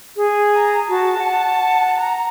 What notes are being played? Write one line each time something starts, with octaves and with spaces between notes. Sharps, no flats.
G#4
A#5
F#4 A5
F#5
A#5